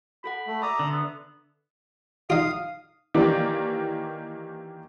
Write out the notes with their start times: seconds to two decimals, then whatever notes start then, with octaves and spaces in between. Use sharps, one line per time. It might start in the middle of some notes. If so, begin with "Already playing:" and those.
0.24 F#4 A4 F#5 B5
0.47 A3
0.62 D5 E5 A#5 D#6 E6
0.79 D3
0.91 B3 E6
2.30 D#4 F4 F5 D#6
3.14 D#3 E3 A#3 G4 D5